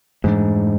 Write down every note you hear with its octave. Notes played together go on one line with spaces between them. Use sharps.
F2 G#2 E3 A3 D4